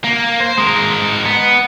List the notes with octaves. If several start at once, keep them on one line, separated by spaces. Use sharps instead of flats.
A#3
C5
G#3 A#4
B3